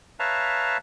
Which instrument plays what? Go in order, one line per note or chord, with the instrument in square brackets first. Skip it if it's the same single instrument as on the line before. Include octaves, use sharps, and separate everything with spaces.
[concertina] B4 C#5 E5 F5 A5 A#5